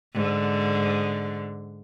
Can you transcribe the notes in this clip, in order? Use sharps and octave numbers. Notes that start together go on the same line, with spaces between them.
G#2 D3